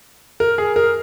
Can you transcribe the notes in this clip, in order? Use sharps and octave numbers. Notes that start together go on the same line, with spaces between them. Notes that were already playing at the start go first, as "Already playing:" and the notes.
A#4
G#4
A#4